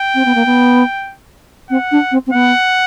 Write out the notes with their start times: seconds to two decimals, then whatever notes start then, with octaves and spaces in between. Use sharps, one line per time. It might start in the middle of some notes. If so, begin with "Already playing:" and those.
Already playing: G5
0.15 C4
0.25 B3
0.35 A#3
0.46 B3
1.70 C4 F#5
1.92 D4
2.12 C4
2.27 C4
2.33 B3 F#5